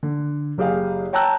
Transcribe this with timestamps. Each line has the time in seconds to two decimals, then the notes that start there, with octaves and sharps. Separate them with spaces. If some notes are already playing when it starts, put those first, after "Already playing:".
0.03 D3
0.58 F#1 G4 G#4 F5
1.13 C#5 G5 A5 A#5 E6 F#6